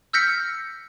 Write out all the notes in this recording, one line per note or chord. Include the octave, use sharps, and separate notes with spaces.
E6 F6 G6 A#6 B6 C#7